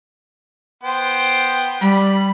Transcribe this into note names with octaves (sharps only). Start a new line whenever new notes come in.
B3 C5 G5
G3 B5